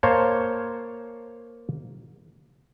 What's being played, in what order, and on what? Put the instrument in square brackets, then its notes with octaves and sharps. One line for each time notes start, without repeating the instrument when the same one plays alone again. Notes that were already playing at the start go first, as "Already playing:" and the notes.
[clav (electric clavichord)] A#3 C5 C#5 A5